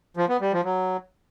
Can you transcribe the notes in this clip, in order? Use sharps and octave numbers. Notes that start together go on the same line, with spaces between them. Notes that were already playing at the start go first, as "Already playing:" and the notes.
F3
B3
G3
F3
F#3